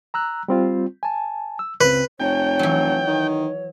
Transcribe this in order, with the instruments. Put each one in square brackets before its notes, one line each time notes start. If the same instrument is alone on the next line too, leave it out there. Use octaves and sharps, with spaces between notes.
[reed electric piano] A#5 E6 F#6
G3 C4 F4
G#5 A5
E6
[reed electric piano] C#2 C#3 C4 [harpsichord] B4
[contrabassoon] F1 [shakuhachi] C#5 [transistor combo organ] G5
[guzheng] E3 F#3
[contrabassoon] D#3